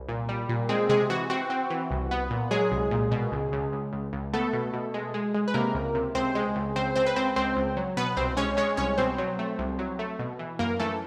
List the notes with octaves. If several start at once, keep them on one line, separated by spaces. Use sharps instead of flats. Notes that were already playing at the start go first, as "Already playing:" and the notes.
Already playing: C2
A#2
G3
A#2
G#3 C4 G#4
C3 G#3 G#4
E3 F#4
C4 F#4
C4
E3
C2
B3
A#2
F#3 G#3 G#4
C2
A#2
B2
C#2
C#2
C#2
C#2
C#2
A3 B3 A4
B2
B2
G#3
G#3
G#3
B4
C3 A#3 A#4
C#2
C3
C#2 C4 C5
G#3
C#2
C#2 C4 C5
C#2 C4 C5
B4
C#2 C4 C5
C#2 C4 C5
C#2
F#3
B2 B3 B4
C2 C4 C5
G#3 C#4 C#5
G#3 C#4 C#5
C2 C#4 C#5
B2 C4 C5
F#3
A3
C2
F#3
A3
B2
E3
F#2 A#3 A#4
E3 A3 A4